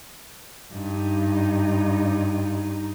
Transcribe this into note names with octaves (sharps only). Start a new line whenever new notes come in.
G2 D#4